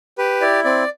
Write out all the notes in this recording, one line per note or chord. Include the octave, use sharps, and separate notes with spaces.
G4 B4
E4 D5
C4 D5